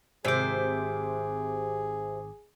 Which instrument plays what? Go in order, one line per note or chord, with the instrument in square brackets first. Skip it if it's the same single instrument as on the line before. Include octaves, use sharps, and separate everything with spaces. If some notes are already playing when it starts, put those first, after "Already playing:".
[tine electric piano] G#1 D6 [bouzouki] C3 C5 [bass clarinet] G#4